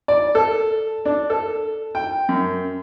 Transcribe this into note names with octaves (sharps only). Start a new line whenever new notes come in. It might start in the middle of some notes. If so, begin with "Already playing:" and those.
D5
A4
D4
A4
G5
F#2